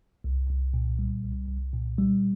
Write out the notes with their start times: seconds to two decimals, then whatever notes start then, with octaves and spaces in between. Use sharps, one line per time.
0.24 C2
0.50 C2
0.74 A#2
0.99 G3
1.24 C2
1.48 C2
1.73 A#2
1.98 G3